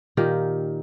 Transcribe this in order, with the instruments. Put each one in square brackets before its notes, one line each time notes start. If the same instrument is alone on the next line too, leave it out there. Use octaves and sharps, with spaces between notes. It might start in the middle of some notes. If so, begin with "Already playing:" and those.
[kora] A#2 D#3 G4 A#4